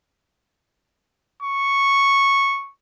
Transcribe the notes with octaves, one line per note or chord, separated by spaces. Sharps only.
C#6